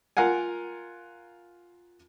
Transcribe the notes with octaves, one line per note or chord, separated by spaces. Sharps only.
F4 A#4 F5 F#5 G#5